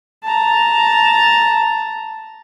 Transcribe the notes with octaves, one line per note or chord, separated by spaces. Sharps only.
A5 A#5